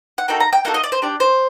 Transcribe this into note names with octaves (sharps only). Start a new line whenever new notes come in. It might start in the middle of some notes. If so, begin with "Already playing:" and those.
F#5
A#3 D#4 F#4 A4 G5
A#5
G5
A#3 D#4 F#4 A4 F#5
D#5
D5
C5
D4 G4 D5
C5